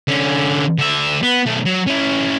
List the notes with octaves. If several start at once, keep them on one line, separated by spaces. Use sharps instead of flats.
D3 C#4
D3 E5
B3
B1 A3
F#3
C#4 E4